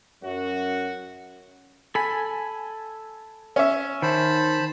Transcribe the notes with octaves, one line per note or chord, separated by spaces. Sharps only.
F#2 F#4
A4 G#5 B5
C#4 E5
D#3 C5 A5 B5